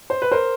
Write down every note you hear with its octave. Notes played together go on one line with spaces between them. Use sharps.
C5
B4
A#4 C5